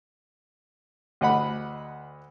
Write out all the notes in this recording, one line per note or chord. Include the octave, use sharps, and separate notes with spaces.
D2 D#5 F#5 B5